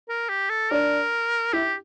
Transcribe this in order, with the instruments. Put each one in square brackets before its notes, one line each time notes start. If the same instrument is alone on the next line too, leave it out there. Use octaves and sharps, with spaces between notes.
[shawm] A#4
G4
A4
[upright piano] D4 [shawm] A#4
[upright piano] E4 [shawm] G4